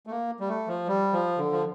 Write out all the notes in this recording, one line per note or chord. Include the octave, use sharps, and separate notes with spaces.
A3
A#3
G3
A3
F3
G3
F3
D3
F3